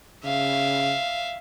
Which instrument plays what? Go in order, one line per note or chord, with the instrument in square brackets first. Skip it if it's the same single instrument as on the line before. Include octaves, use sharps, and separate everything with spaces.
[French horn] C#3 [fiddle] E5 F5